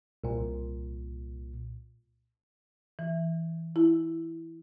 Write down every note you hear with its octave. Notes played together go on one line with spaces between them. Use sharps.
C2 A#2
E3
E4